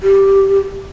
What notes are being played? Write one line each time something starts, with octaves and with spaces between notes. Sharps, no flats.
G4